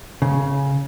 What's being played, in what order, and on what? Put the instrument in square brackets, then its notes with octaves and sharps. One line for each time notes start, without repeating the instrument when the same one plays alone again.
[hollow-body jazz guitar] C#3